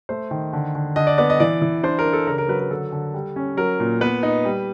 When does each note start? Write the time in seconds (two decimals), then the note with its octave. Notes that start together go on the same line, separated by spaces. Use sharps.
0.09 A3 C5
0.31 D#3
0.53 D3
0.75 D3
0.96 D3 D#5
1.07 D5
1.18 B3 D5
1.30 D#5
1.40 E3 D5
1.62 E3
1.83 D4 C5
1.99 A#4
2.05 D4
2.13 A4
2.27 C#3 A#4
2.38 A#4
2.48 F#3 B4
2.60 A#4
2.70 D3 A4
2.92 D3
3.14 G3
3.36 C#4
3.57 F#3 A#4
3.80 A#2
4.01 B3 B4
4.23 D#4
4.45 G3